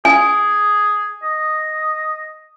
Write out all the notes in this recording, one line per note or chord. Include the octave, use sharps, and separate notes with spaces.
G#4 G#5
D#5